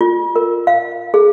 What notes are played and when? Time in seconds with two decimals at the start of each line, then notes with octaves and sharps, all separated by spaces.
0.01 F4
0.36 A#4
0.67 F5
1.14 G#4